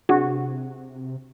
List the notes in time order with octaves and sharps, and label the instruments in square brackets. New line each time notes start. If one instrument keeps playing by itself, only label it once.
[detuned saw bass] C3 [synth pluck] D4 G#4 [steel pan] F#4